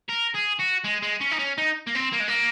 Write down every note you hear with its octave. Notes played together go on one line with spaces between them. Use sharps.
A#4
G#4
F#4
G#3
G#3
C#4
D#4
C#4
D#4
A#3
C4
A#3
G#3
A#3